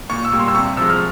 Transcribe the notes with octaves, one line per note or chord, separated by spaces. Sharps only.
A#2 C#6
E6
G3 A#3
C6
E6
C3 C#6
F3 G#3 E6
F6